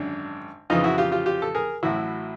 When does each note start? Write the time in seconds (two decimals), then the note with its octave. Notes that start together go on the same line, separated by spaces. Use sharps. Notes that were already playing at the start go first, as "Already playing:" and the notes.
Already playing: G#1 F#2 D3 D4
0.70 F2 C#3 E3 D#4 F4
0.84 E4 F#4
0.98 F4 G4
1.12 F4 G4
1.26 F4 G4
1.42 A4
1.55 G#4 A#4
1.83 A1 A2 F#3 E4 F#4